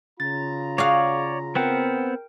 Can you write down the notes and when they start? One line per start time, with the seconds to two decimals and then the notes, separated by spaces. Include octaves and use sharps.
0.20 C#3 F4 A#5 A6
0.78 F#4 G#4 C#5 D5 F5
1.55 B3 C4 A#4 F#5 G5